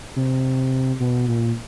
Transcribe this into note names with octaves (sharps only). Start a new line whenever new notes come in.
C3
B2
A#2